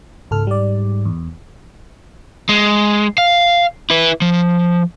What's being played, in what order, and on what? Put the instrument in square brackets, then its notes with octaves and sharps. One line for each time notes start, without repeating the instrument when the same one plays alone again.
[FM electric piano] C#2 A4 F6 [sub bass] G#2
[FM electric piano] G3 D5
E2
[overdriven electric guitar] G#3
F5
E4 B4
F3